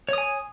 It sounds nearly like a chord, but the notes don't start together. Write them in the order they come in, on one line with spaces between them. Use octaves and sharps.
C#5 D#6 G#5